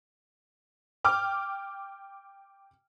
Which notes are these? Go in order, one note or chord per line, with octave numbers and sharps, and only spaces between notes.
G5 D6 F6